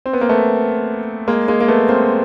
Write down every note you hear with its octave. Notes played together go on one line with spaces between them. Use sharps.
C4
B3
A#3
A3 B3
G#3 A#3
G#3 A#3
A#3
A3 B3
A#3 C4